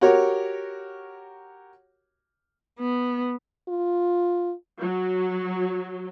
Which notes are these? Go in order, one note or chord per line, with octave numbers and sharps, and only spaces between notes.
F#4 G4 A#4 C#5
B3
F4
F#3